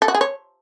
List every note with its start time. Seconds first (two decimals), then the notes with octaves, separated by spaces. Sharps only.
0.02 A4
0.08 F#4
0.15 G#4
0.21 C#5